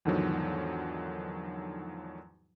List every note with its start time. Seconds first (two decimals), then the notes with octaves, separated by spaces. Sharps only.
0.05 E2 G#2 D3 D#3 F3 F#3